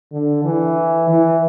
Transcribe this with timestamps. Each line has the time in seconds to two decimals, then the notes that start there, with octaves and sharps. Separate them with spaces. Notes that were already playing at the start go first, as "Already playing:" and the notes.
0.12 D3
0.45 E3
1.09 E3